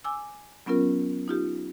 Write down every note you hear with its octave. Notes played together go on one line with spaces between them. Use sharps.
G#5 D6 E6
F#3 B3 C#4 F4 A#4
D#4 F4 G4